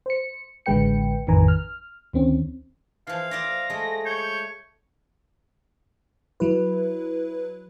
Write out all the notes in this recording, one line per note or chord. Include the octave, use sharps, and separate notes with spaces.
C5 C#7
A1 D3 G#3 B4 G5 C#7
A1 F2 D#3 B4 G#5 A#5
F6
D2 D#3 C4 C#4
E3 F3 F5
F4 D5 E5 A#6
G#3 A3 G#4
C#5 G6
F#3 E4 B4